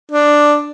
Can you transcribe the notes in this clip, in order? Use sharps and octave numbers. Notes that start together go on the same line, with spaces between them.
D4